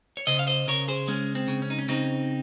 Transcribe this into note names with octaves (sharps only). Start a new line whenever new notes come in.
C#5
C#3 C5 D#5
F5
C5 D#5
C#3 A#4 C#5
G#4 C5
G#3 C#4
C4
C#3
C#4
D#4
C#4
C#3 C4 D#4